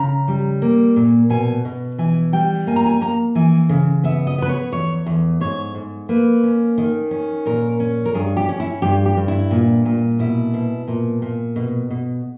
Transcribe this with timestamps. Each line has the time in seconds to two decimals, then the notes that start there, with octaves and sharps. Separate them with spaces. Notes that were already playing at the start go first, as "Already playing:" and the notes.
Already playing: C#3 A#5
0.28 G3
0.62 A#3
0.96 A#2
1.30 B2 G#5
1.65 B2
1.98 E3 G#5
2.33 G3 G5
2.67 A#3 G#5
2.76 A#5
2.86 G#5
3.01 A#3 A#5
3.35 E3 G#5
3.69 C#3
4.04 B3 E5
4.27 D#5
4.38 B3 B4
4.49 C#5
4.72 E2 C#5
5.06 E2
5.41 G#2 C#5
5.75 G#2
6.09 A#3 B4
6.43 C#4
6.78 D#3
7.11 C#4
7.46 A#2 A#4
7.80 C#4
8.06 A#4
8.14 G2 G#4
8.37 G4
8.49 C#4
8.60 E4
8.82 G2 G4
9.05 G4
9.17 G2
9.28 E4
9.51 A#2
9.85 A#2
10.19 B2 E4
10.54 B2
10.88 A#2
11.22 A#2
11.56 B2
11.91 B2